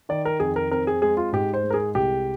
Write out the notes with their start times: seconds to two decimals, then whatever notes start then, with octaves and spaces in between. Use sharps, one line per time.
0.09 D#3 D5
0.25 A#4
0.40 F2 G#4
0.56 A#4
0.71 C4 A#4
0.87 G#4
1.02 G#3 G#4
1.17 F4
1.32 G#2 G4
1.54 C5
1.63 G#3
1.70 A#4
1.74 G#4
1.95 C2 G4